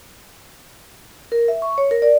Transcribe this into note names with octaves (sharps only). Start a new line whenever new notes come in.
A#4
E5
C#6
C#5
A#4
D5